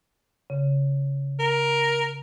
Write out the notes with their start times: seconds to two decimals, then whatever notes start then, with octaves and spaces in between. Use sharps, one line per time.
0.50 C#3
1.39 A#4